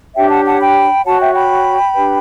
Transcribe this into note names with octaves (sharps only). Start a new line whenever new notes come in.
D4 G4 C#5 E5 G5
F#5 A5
F#5 A5
G5 B5
F#4 C#5 F#5 A5
E5 G5
G5 B5
D4 G4 B4